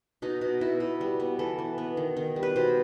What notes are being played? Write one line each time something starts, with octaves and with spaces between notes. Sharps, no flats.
B2 D#4
B2
B2 E4
B2
G3
B3
E3 A4
E3
B3
D#3
D#3
G3
B4
B2 C5